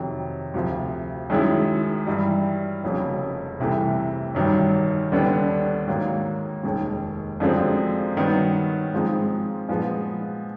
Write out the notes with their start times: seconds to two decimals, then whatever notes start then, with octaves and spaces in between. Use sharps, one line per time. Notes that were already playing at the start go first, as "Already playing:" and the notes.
Already playing: F2 C3 D#3 F#3
0.54 D2 C3 F3
1.30 F#2 D#3 G#3 C#4 E4
2.07 G2 E3 G3
2.83 F1 F2 C#3 F#3 A#3
3.60 C2 C3 E3 A3
4.35 A1 G2 D#3 F#3
5.12 D#2 D3 G3 B3 D4
5.88 G#2 D#3 F#3 A#3
6.63 F1 D#2 D#3 G#3
7.40 F#2 D3 F3 G#3 C4
8.17 G2 D#3 F#3 B3
8.92 G#2 F3 G#3 C4 D#4
9.68 A#2 F3 G#3 B3